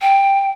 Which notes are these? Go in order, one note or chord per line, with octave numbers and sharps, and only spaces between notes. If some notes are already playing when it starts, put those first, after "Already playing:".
G5